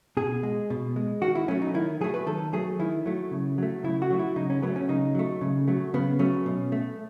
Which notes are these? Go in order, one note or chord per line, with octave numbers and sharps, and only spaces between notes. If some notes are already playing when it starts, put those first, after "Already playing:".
B2 G#4
G#3
B2
G#3
D#3 F#4
E4
F#3 A3 C#4
D#4
D#3 E4
F#3 A3 G#4
B4
D#3 A4
F#3 A3 G#4
D#3 E4
F#3 A3
C#3
F#3 A3
C#3 E4
F#4
F#3 A3
E4
C#3 D#4
C#4
F#3 A3 B3
C#4
C#3 D#4
F#3 A3
C#3
F#3 A3
C#3 B3
F#3 A3 C#4
B2
A3